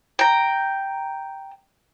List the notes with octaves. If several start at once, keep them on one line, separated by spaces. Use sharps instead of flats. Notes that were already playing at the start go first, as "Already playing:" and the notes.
G5 A#5